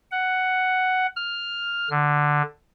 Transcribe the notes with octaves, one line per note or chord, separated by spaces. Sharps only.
F#5
F6
D3